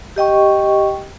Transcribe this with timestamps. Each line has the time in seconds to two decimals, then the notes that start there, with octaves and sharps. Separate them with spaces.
0.16 G4 D#5 G5 C#6